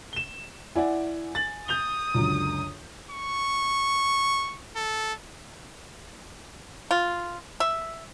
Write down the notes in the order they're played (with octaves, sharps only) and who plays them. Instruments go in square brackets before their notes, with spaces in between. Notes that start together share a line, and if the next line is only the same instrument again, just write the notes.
[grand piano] E7 G7
[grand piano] E4 D5 F#5 [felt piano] G#5
[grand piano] A6 F#7
[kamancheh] D#6 [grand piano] G6 F7 G7
[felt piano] C#2 F#2 D3
[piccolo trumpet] C#6
A4
[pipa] F4
E5